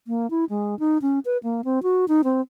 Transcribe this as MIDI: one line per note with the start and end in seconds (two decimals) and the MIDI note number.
0.07 0.30 58
0.30 0.45 64
0.50 0.78 56
0.79 0.98 63
1.02 1.19 61
1.25 1.38 71
1.43 1.61 58
1.65 1.82 60
1.83 2.05 66
2.08 2.22 63
2.24 2.41 60